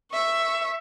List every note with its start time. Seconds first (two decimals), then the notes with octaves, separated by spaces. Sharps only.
0.12 E5 C#6